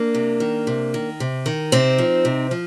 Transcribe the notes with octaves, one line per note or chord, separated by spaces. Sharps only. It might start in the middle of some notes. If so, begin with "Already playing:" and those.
Already playing: A#3 D4
C3
D#3
C3
D#3
C3
D#3
C3 C4 D#4
F3
C3
F3